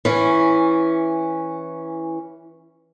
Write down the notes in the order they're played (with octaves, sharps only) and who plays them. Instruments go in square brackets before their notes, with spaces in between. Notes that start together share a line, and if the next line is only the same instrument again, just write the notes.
[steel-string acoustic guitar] E3 C#4